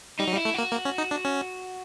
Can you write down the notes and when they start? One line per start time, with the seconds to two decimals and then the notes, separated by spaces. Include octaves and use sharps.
0.20 G3 D#4
0.28 F#3
0.32 G3
0.36 E4
0.45 A3
0.54 A#3 F#4
0.72 A#3
0.85 C#4
0.98 D#4
1.11 D4
1.25 C#4